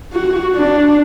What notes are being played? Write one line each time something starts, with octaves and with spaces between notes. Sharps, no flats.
F#4
D4